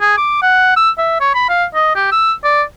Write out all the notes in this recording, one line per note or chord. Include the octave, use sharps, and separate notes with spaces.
G#4
D6
F#5
E6
E5
C#5
B5
F5
D#5
G4
E6
D5